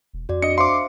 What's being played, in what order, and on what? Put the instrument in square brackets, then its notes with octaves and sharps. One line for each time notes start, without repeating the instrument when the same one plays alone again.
[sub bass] E1
[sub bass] F2 [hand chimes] F#4 D5
[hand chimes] D4 [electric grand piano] D#5 C#7
[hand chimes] C5 E5 F5 [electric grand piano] C6 D6